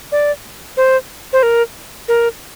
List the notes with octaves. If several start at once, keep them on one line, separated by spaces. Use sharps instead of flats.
D5
C5
C5
A#4
A#4